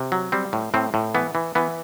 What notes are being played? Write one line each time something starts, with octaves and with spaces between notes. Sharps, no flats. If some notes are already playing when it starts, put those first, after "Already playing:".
Already playing: C3
F#3
G3 C4
A2
A2 C4
A2
E3 B3
E3
E3 B3